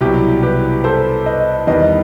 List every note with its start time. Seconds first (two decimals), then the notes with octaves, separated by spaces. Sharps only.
0.01 C2 B2 F#3 E4 G4
0.42 G4 B4
0.84 A4 C5
1.26 B4 D#5
1.67 E2 D#3 G3 B4 D#5